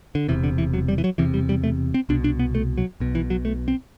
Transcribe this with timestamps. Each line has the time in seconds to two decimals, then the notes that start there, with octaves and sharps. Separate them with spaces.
0.15 D3
0.28 E1 E2 C3 E3
0.44 D3
0.58 E3
0.74 F#3
0.88 G3
0.98 E3
1.04 F#3
1.18 E1 E2 C3 E3
1.34 G3
1.49 G3
1.64 A3
1.94 C4
2.09 C2 B2 D4
2.24 D4
2.39 B3
2.55 A3
2.78 F#3
3.00 B1 B2
3.15 E3
3.30 F#3
3.45 A3
3.68 C4